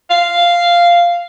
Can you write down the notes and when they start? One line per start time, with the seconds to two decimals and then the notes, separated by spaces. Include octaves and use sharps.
0.10 F5